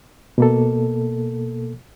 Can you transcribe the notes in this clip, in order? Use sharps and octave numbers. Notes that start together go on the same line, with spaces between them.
B2 A#3 A4